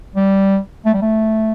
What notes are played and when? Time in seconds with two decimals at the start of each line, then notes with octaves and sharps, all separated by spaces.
0.15 G3
0.85 A3
0.94 G3
1.02 A3